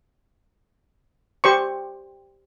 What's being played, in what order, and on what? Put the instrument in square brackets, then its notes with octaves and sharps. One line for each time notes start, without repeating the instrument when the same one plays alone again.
[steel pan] G4 C5 C#6